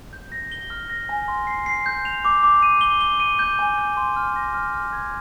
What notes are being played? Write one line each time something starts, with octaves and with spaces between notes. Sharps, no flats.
G6
A#6
G7
F6
A#6
G#5
C6
C7
C7
G6
F7
D6
D6
D#7
G7
G7
D#7
G6
G#5
G6
C6
F6
A#6
F6
F6
G#6